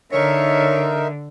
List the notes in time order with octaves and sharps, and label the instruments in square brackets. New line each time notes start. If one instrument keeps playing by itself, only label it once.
[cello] D3 [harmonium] D#4 A#4 E5 [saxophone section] C#5